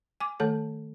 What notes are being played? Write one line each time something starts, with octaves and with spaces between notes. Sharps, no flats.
G#5 D6
D#3 A3 A4 C#5